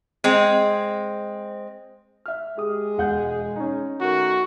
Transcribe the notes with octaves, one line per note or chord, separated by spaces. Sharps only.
G#3 C4
E5 F6
G#3 G4 G#4 D#6
E1 F#5 G6
C#4 D#4
D#3 A3 F#4 A#4